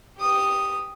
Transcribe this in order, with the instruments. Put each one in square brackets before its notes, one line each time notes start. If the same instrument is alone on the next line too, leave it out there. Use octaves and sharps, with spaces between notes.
[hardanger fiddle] G4 D#6